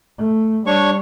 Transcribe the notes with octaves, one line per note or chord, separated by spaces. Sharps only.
A3
G3 D4 C#5 C#6